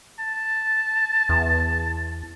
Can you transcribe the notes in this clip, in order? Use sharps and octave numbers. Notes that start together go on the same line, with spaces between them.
A5
E2